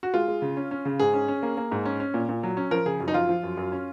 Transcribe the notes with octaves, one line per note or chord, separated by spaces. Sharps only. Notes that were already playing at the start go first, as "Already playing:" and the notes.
F#4
G#3 F4
G#3
C#3
C#4
C#4
C#3
G#2 G#4
C#4
C#4
A#3
A#3
G#2
C#4
C#4
A#2
A#2
F#3
C#4
F3 A#4
C#3 G#4
F#2
D#4
F3 F4
F3
F#2
F#2
C#4